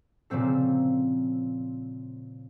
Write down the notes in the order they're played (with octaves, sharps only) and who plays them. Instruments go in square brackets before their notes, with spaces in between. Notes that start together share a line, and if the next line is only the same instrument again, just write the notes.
[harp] A#2 C#3 F3 C4 A4